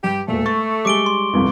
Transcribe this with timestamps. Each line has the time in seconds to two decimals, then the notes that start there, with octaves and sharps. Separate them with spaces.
0.04 G2 G4
0.28 E1 A#2 A3
0.46 C#6 A6
0.85 G3 G#3 D6 D7 G7
1.06 C6
1.33 G1 C2 F2